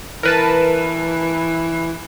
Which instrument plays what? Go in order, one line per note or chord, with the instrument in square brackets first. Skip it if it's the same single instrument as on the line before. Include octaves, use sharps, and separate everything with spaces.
[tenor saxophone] E3 [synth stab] A#4 B4 A5